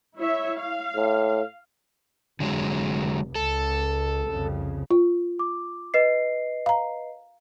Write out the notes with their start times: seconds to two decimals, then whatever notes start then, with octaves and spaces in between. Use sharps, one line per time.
0.16 E4 C#5 E5
0.59 F5
0.95 A2
2.40 F1 D3 F#3 G#3
3.35 C#2 A4
4.28 C2 F2 C#3
4.90 F4
5.39 D6
5.94 B4 D#5 C7
6.66 F5 A#5